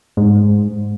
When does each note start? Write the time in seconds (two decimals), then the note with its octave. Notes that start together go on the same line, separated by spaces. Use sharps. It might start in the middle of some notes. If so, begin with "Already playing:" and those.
0.17 G#2